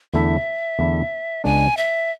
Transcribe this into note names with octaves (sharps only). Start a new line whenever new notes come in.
E2 D3 A3 E4 A4 E5
E2 D3 A3 E4 A4
C#2 C#3 G#3 B3 D4 G#5
E5